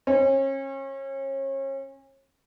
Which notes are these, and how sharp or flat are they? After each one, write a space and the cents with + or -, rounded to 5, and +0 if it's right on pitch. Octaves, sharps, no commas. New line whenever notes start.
C#4 -35